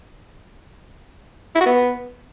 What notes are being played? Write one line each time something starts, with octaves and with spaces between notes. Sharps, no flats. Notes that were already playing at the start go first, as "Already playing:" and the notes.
E4
F#4
B3